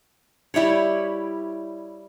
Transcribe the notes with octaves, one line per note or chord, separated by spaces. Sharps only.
G3 E4 G4 C#5